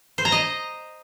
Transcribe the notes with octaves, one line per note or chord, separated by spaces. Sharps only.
C5
A#5
D#5